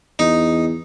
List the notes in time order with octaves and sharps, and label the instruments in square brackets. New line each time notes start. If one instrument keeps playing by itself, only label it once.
[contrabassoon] E2 [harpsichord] D#4